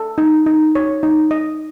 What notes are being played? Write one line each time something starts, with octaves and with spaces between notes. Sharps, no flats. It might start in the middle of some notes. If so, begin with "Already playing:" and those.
Already playing: A4
D#4
D#4
C#5
D#4
D#5